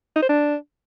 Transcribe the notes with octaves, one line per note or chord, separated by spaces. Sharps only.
D#4
C5
D4